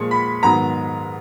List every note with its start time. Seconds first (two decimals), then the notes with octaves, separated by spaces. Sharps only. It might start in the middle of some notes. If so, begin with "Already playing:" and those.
Already playing: A#2 F3 G#3 C#6
0.11 B5
0.43 G#2 D#3 F#3 B3 A#5